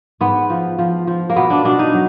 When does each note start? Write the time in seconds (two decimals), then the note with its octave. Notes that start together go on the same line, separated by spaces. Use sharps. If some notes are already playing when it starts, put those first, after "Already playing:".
0.21 G#2 B3
0.50 F3
0.79 F3
1.07 F3
1.30 A#3
1.36 B2 B3
1.50 D4
1.65 B2 D4
1.79 D#4
1.93 F#3